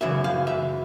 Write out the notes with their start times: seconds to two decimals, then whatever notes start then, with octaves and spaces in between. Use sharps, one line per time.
0.01 F#2 C#3 E3 E5
0.24 F5
0.47 E5